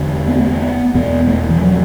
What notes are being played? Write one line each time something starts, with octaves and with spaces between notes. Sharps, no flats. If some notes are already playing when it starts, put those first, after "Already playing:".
Already playing: E2 D3
B3
A3
B3
E2 B2 B3
A3
E3
F#3